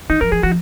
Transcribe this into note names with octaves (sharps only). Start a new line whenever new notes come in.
D#3 D#4
F3 A#4
F3 G#4
F3 F#4